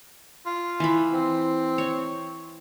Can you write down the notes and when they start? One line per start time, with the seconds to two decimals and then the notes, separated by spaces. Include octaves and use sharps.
0.46 F4
0.80 E3 B5
1.13 C4
1.78 C#5